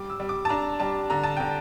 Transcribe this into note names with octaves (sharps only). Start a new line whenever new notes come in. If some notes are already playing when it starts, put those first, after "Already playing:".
Already playing: G3 D6
E6
G3
D6
A5
D4 A#5
G3 A5
D3 A#5
A5
D3 G5